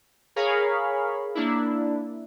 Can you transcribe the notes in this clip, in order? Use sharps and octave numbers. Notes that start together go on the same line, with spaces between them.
G#4 A#4 C#5 F5 B5
A#3 D4 E4